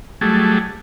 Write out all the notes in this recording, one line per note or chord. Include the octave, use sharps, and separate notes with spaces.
F#3 G3 A3 G#4